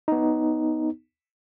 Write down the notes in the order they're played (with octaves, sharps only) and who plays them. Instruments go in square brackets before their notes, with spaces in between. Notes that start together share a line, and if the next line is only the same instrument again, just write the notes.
[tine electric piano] B3 D#4